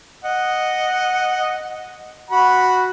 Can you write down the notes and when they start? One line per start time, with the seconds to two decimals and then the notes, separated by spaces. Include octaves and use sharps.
0.24 D#5 F#5
2.31 F#4 F#5 B5